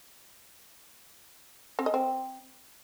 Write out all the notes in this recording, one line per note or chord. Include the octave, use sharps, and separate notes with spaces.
C4
D#5
C4